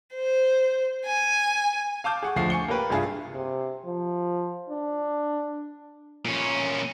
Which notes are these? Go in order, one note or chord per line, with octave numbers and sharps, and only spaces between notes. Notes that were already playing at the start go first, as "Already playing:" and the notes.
C5
G#5
F5 A5 D6 G6
G#4 F#5 C#6
D2 A2 F3 F#5 C#6 C7
G#5 C#6 C#7 G7
A#3 G4 A#4 B4 G5
C2 G2 F4 G#4 E5
C3
F3
D4
A#2 C#4